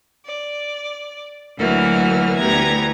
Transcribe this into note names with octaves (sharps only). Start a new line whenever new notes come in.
D5
D2 E3 F#3 A#3 F#4 F6
D2 E3 B3 G4 A#5 G#6